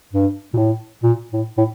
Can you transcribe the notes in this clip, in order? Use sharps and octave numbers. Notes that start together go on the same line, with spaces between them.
G2
A#2
A2
A#2
A2
A2